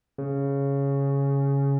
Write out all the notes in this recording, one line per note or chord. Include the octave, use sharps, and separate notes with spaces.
C#3